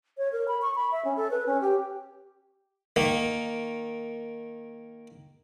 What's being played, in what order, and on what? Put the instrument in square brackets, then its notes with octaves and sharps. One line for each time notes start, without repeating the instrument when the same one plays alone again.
[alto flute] C#5
A#4
B5
C#6
B5
E5
C#4
A4
B4
C#4
G4
[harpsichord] D#3 A#3